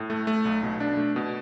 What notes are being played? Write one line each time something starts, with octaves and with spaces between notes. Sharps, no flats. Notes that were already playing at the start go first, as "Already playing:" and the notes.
Already playing: A2
A3
A3
B1
B2
D4
A3
B2